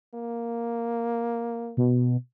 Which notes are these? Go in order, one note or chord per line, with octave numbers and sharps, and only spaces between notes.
A#3
B2